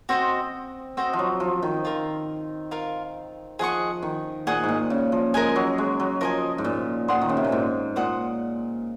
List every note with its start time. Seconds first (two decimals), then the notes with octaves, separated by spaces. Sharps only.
0.09 C4 F#4 C5 D#5
0.97 C4 F#4 C5 D#5
1.13 F3
1.19 F#3
1.40 F3
1.63 D#3
1.85 F4 A#4 F5
2.71 F4 A#4 F5
3.59 F3 G#4 D#5 F#5 C#6
4.02 D#3
4.47 A#2 G#4 D#5 F#5 C#6
4.63 G#2
4.69 A#2
4.90 C#3
5.12 F3
5.34 G#3 A#4 D#5 G#5
5.56 F#3
5.78 G#3
6.00 F#3
6.21 F3 A#4 D#5 G#5
6.58 G#2
6.64 A#2
7.08 A#2 C5 F#5 C6 D#6
7.21 D#3
7.29 C#3
7.37 C3
7.44 A#2
7.52 G#2
7.96 A#2 C5 F#5 C6 D#6